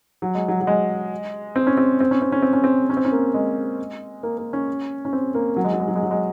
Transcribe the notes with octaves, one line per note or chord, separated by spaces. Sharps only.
F#3
G#3
F#3
F#3
G#3
C4
C#4
C4
C4
C#4
C4
C#4
C4
C#4
C4
C#4
C4
C#4
A#3
G#3
A#3
A#3
C#4
C#4
C4
A#3
F#3
G#3
F#3
G#3
F#3
G#3
F#3
G#3